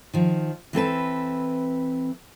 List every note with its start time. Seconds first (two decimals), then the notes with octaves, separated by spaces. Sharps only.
0.13 D#3 F3
0.73 E3 C4 A4 B4